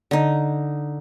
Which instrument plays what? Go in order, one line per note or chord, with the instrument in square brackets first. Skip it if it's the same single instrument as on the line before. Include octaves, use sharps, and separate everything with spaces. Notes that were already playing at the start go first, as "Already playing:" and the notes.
[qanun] D3 D#4